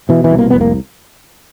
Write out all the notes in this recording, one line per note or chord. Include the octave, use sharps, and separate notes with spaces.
B2 E3
E3
C2
A#3
F1 B3
A#3